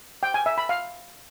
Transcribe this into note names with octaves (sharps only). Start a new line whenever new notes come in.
G5
G#5
E5
B5
F5